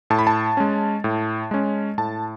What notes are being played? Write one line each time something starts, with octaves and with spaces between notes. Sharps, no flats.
A2 A5
B5
A5
G#3 C#4
A2
G#3 C#4
A2 A5